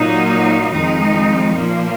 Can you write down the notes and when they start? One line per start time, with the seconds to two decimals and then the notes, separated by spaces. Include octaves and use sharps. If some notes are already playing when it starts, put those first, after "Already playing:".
Already playing: A#2 F#3 A#3 D#4
0.73 F2 D#3 G#3 D#4
1.56 A#2 F3 A#3